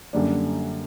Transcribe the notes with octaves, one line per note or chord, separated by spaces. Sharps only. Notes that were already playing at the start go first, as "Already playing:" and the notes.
F#2 D3 G3 A#3 D4